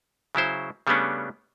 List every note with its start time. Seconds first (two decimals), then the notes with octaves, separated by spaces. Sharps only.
0.35 C#3 F#3 E4 C5
0.87 C#3 G3 A3 B3 C#4 D4